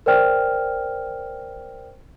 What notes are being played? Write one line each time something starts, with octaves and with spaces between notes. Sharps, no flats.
A#4 C5 D5 G5 F6